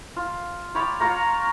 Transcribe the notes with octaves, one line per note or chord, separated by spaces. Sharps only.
F4
C#5 D5 G5 B5
F4 C#5 G5 A#5